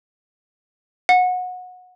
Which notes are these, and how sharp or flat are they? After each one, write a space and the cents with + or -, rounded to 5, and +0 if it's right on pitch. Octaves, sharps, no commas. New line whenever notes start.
F#5 -25